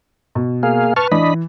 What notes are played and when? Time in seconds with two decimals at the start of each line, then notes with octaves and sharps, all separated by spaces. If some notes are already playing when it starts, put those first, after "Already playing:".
0.35 B2
0.63 A#3 G#4 F5
0.96 B4 A5 C#6 F6
1.12 E3 D4 D#5 B5